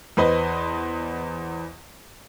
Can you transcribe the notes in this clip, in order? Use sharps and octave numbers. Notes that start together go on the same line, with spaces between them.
E2 B4 C5 D#5 C6